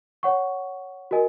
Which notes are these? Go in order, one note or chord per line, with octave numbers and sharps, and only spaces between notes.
C#5 F#5 C#6
F#4 A#4 D#5 G#5